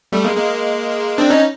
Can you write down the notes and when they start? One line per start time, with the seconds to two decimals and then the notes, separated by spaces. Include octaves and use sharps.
0.12 G3 A3
0.24 G#3 A#3
0.36 G#3 A#3
1.18 C4 D4
1.30 C#4 D#4